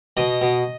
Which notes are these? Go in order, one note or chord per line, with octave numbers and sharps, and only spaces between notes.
B2 D#5
B2